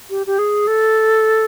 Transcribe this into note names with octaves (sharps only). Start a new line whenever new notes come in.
G4
G4
G#4
A4